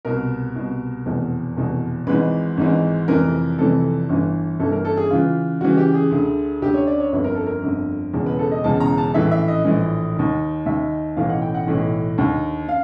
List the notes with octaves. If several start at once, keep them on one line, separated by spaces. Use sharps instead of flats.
C2 B2 A#4
C2 B2
F1 E2 B2
F1 E2 B2
G#1 G#2 E3 B4
G#1 G#2 E3
F1 F2 C3 E3 A#4
F1 F2 C3 E3 A4
G1 G2 E3
G1 G2 E3 A4
A#4
A4
G#4
C#2 C#3 E3 F4
C#2 C#3 E3 F#4
G4
G#4
D2 D3
D2 D3 G4
C#5
D5
C#5
G1 F2 D3 B4
A#4
A4
A#4
G1 F2 D3
E1 E2 C#3
B4
A4
D#5
E1 E2 C#3 A5
A#5
A5
A#1 A2 E3 E5
E5
D#5
A#1 A2 E3
D#2 D#3
D#2 D#3 E5
B1 A2 E3 F5
F#5
G5
F#5
B1 A2 E3
D#2 D3
F5